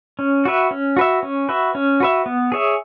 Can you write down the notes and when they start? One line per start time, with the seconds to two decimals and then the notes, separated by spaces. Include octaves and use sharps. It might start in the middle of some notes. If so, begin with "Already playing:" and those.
0.19 C#4
0.45 F#4 B4 E5
0.71 C#4
0.97 F#4 B4 E5
1.23 C#4
1.49 F#4 B4 E5
1.75 C#4
2.00 F#4 B4 E5
2.26 B3
2.52 G#4 C#5 E5